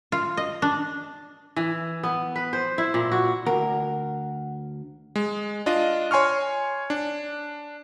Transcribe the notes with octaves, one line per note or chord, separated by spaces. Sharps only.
F4
D#5
D4
E3
B3
B4
C5
E4
A#2
F#4
D2 A#4 F#5
G#3
D4 F4 D#5
C#5 G#5 C6 C#6 F6
D4